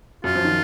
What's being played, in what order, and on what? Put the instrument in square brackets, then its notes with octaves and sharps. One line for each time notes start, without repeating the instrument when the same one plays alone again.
[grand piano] F#2 [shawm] F4
[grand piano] F3
D#3